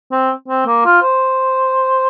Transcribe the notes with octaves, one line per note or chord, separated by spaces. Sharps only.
C4
C4
A#3
F4
C5